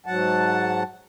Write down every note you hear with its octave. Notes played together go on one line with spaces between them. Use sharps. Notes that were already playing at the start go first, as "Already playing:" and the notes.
G#2 F#3 F#5 A5